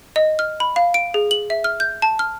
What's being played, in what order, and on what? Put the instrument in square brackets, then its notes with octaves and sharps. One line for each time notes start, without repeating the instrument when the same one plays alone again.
[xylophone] D#5
F6
B5
F5
D7
G#4
F#7
E5
F6
G6
A5
F6